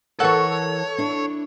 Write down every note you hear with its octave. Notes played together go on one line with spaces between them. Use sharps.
E3 A4 A#4 C#5 F#5 C#6
D4 E4